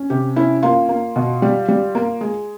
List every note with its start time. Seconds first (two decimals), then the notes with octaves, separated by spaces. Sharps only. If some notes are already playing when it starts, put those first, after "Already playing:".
Already playing: C#4
0.10 C3 G4
0.36 C#4 E4
0.63 A#3 F4
0.89 A#3
1.16 B2
1.42 G3
1.68 G3
1.95 A#3
2.21 G#3